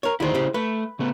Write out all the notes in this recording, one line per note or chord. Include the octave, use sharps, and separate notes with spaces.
A#4 C#5
D2 D#3 E4 G#4 C5
C#3 G4
A3 B4
C#3 A3 B3